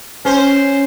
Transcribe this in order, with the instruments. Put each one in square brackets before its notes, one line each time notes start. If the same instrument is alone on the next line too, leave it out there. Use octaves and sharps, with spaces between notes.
[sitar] C#4 C5